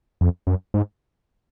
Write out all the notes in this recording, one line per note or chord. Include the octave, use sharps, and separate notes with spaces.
F2
F#2
G#2